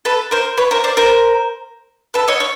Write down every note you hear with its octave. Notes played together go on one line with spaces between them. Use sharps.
A4 B4
A#4 C5
B4 C#5
A#4 C5
C5 D5
A#4 C5
A4 B4
C#5 D#5
C#5